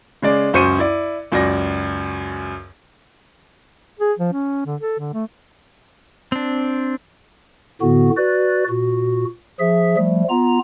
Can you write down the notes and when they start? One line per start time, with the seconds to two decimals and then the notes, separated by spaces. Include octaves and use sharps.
0.22 C#3 G#3 D5 D6
0.53 C#2 F#2 C5 C#6 C#7 D#7
0.79 E4 D5
1.32 C#2 F#2 D5 A#6
4.00 G#4
4.19 F3
4.33 C#4
4.66 D3
4.81 A4
4.99 D3
5.13 A3
6.32 C4 D4
7.82 A2 D3 B3 F#4
8.17 F#4 B4 D5
8.70 A#2 F#4
9.59 F3 G#4 E5
9.97 F3 G3 A3
10.29 B3 F4 A#5